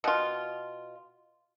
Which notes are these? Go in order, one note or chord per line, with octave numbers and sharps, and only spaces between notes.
B2 F4